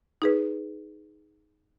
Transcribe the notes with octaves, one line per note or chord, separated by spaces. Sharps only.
D#4 G#4 B4